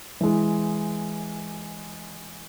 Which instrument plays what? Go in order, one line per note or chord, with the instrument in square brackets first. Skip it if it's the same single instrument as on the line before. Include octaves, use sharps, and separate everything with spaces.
[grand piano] E3 G#3